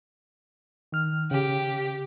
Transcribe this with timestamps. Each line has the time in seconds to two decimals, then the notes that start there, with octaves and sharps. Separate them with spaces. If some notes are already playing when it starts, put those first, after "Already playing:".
0.92 D#3 F6
1.31 C#3 G4